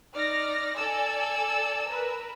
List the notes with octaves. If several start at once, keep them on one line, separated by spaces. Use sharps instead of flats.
D#4 D5 F6 A#6
A4 D5 G#5 E6
A#4 B4